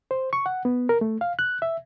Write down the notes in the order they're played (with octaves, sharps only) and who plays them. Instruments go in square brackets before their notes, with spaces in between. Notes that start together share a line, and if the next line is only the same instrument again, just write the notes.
[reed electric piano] C5
C#6
F#5
B3
A#4
A3
F5
F#6
E5